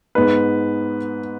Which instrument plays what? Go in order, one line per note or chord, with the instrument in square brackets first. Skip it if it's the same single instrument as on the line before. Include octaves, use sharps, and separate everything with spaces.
[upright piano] G#2 G#3 B3 B4